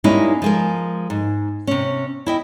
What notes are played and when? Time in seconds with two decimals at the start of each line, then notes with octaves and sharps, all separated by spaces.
0.04 G3 G#3 A#3 C#4 D#4 E4
0.42 F3 G#3 A#4
1.10 G#2
1.67 C3 C#4
2.26 E4 D#5 G5